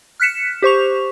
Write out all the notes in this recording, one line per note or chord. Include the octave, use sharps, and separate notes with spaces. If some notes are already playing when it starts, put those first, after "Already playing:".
F6 F#6 B6 C#7 E7
G4 C5 C#6 F7